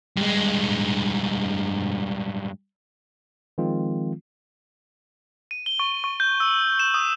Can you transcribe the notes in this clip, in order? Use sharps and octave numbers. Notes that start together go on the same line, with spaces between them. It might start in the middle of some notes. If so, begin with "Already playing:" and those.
G2 G#3
D#3 F3 G#3 C4 F4
D#7
G7
C#6
C#6
G6
E6
E7
D#6